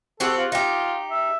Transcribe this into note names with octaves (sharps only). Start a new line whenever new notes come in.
C4 F#4 G4 A4
F4
D#4 F4 G4
E5